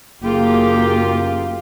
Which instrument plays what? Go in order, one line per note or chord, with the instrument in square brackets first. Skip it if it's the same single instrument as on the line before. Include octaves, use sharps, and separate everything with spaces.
[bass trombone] F#1 [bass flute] A#3 [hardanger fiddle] F4 G4 [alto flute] G#4